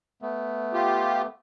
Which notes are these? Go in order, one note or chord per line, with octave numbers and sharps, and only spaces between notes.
A3 B3
F4 G4